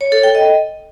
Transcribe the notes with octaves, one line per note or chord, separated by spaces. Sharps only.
C#5
A4
G5
D#5